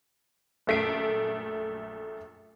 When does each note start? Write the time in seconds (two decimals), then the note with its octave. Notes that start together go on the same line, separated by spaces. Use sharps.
0.67 A#1 F#2 A3 B6 C7 D7